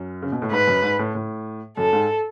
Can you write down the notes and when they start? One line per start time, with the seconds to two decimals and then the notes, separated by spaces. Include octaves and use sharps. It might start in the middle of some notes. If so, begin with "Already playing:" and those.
Already playing: F#2
0.22 C#3
0.32 B2
0.42 A2
0.51 G#2 B4
0.67 F#2
0.83 G#2
0.99 A2
1.15 A2
1.77 F#2 A4
1.93 G#2